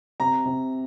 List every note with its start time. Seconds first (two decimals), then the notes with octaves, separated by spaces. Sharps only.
0.20 C3 A#5
0.45 C3